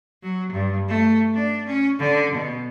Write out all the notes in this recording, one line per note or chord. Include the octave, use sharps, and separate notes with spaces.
F#3
G2
A3
D4
C#4
D3
B2